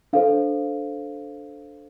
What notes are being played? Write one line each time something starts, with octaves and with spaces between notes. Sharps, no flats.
D4 A4 C5 F5